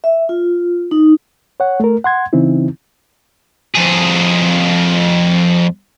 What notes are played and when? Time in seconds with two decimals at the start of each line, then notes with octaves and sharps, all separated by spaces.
0.04 E5
0.29 F4
0.91 D#4
1.60 C#5 F#5
1.80 A3 A#4
2.04 F#5 C6 G#6
2.33 C#3 E3 C4 D#4 E4
3.75 F2 G#4